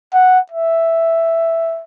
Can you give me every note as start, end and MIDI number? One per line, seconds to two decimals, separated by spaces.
0.14 0.39 78
0.51 1.83 76